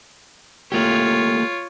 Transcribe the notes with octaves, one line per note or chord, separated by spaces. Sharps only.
A3 A#3 F4 G4 C#5